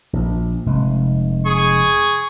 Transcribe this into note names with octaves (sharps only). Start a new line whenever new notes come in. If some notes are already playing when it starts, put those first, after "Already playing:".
A#1
F1 G#3
G#4 C#6